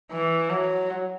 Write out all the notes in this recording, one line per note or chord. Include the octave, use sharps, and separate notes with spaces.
E3
F#3